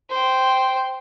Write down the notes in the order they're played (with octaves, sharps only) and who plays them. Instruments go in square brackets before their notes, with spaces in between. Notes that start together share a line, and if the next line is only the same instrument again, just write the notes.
[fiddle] C5 G5